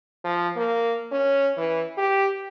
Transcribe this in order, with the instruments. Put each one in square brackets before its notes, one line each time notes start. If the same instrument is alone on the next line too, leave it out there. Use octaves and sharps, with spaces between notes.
[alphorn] F3
A#3
C#4
E3
G4